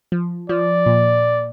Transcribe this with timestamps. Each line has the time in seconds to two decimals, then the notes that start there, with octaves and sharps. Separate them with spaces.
0.12 F3
0.49 F3 D5
0.86 A#2